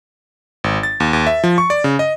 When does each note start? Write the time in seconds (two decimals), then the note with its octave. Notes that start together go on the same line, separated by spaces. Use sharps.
0.64 G#1
0.83 A6
1.00 D#2
1.13 D#2
1.27 E5
1.44 F3
1.58 C#6
1.70 D5
1.84 C#3
1.99 D#5